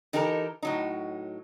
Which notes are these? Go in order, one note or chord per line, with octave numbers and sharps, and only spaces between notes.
E3 D#4 G4 A4 A#4
A2 F#3 D#4